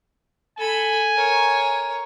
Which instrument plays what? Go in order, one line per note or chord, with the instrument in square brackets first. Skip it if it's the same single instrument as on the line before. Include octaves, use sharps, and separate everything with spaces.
[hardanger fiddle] A4 B5 [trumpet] G#5
[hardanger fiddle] A#4 C#5